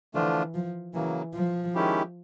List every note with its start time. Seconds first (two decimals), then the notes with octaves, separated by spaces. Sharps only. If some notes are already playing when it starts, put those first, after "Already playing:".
0.14 D3 E3 F3 A3 D4 F4
0.54 F3
0.94 C#3 E3 F#3 A#3
1.34 F3
1.75 D#3 G#3 C#4 E4 G4